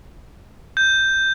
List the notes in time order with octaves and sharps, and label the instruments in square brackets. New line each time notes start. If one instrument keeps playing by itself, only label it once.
[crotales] G6